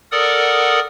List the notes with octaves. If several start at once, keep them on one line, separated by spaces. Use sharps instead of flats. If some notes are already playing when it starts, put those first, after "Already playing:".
A4 A#4 D5 F#5 D#6